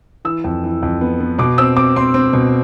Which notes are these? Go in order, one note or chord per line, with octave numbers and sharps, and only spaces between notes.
E3 E6
F2
E3
F2
B3
B3
B2 D6
C4 E6
C4 D6
C4 C6
C4
B2